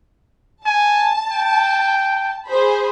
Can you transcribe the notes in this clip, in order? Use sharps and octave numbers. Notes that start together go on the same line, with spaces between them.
G#5 A5
G5
G#4 C5 B5